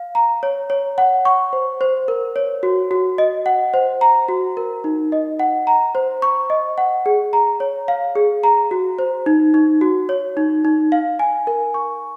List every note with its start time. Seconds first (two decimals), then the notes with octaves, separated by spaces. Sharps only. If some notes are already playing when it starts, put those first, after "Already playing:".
Already playing: F5
0.15 A#5
0.43 C#5
0.70 C#5
0.98 F#5
1.25 C#6
1.53 C5
1.81 C5
2.08 A#4
2.36 C#5
2.63 F#4
2.91 F#4
3.18 D#5
3.46 F#5
3.74 C5
4.01 A#5
4.29 F#4
4.57 A#4
4.84 D#4
5.12 D#5
5.39 F#5
5.67 A#5
5.95 C5
6.22 C#6
6.50 D#5
6.78 F#5
7.06 G#4
7.33 A#5
7.60 C#5
7.88 F5
8.16 G#4
8.43 A#5
8.71 F#4
8.99 C5
9.26 D#4
9.54 D#4
9.81 F#4
10.09 C#5
10.37 D#4
10.65 D#4
10.92 F5
11.19 G#5
11.47 A#4
11.74 C#6